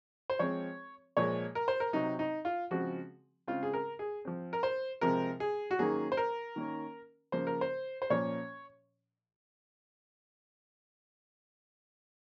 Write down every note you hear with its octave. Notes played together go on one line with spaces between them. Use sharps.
C5
F3 G#3 C4 C#5
A#2 F3 G#3 C#5
A#4
C5
A#4
C3 F#3 C4 D#4
D#4
F4
C#3 F3 G#3 C4 F#4
C#3 G#3 C4 F4
G#4
A#4
G#4
F3 C4
A#4
C5
C3 F3 G#3 C4 A#4
G#4
F#4
D#3 F#3 A#3 C#4 G#4
C5
A#4
D#3 A#3 C#4
C#3 F3 A#3 C5
A#4
C5
C5
A#2 F3 A#3 C#4 C#5